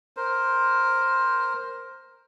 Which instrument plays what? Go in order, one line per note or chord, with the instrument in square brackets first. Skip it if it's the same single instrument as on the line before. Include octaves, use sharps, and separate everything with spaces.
[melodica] A#4 C5